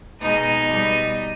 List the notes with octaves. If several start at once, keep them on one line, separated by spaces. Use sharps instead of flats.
B2 G#3 D#4 D#5
B2 G3